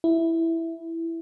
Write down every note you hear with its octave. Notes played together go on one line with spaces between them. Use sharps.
E4